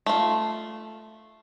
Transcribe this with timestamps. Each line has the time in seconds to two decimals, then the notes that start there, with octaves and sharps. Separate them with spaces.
0.06 A3 F4